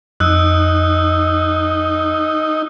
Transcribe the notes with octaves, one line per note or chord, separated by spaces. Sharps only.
F2 D#4 E6 F#6